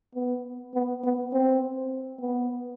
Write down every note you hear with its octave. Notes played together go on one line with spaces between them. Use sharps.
B3
B3
B3
C4
B3